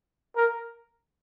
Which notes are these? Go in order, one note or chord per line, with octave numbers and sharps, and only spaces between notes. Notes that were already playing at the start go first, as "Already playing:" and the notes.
A#4